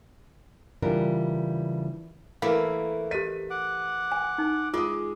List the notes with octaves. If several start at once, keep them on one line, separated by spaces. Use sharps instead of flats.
C#3 E3 G3 D4 F4 A#4
E3 A3 A#3 E4 A#4 F5
G4 D#5 B6 D#7
F#5 D6
G#5
D#4
G#3 F4 D6 D#6